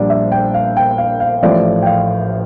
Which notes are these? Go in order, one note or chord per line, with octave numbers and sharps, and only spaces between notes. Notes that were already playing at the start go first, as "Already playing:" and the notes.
Already playing: A#1 A#2 G3 A#3 D4 D5
E5
G5
F5
G5
F5
F5
A1 A2 F3 D5
G5
F5